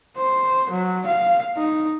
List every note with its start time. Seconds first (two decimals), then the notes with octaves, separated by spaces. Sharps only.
0.17 C5
0.71 F#3
1.06 F5
1.57 D#4